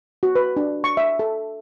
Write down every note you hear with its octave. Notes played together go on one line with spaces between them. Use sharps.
F#4
B4
D4
C#6
E5
A4